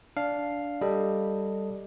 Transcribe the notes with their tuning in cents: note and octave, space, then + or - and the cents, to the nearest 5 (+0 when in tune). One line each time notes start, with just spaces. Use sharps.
D4 -15 F5 +0
G3 +0 A4 +5 D#5 +0